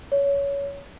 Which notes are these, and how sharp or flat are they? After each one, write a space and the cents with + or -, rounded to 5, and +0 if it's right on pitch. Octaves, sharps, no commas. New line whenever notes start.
C#5 +20